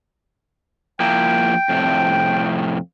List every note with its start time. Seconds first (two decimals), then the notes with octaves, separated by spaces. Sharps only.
1.00 F3 A#3 E4 G5
1.69 F2 A2 C3